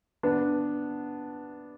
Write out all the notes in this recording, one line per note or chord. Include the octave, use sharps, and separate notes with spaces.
B3 D4